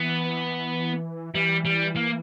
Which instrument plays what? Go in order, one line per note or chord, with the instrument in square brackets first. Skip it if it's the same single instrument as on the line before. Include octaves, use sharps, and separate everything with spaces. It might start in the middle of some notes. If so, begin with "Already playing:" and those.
Already playing: [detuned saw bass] E3 [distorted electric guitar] B3
[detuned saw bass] E3 [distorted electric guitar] G3
[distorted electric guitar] G3
A#3